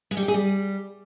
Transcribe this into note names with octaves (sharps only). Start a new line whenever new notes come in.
G#3
G3
G4
G#4
G3